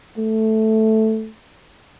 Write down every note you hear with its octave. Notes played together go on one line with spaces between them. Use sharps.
A3